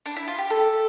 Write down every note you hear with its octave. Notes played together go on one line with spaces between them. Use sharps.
D4
E4
F4
G4
A4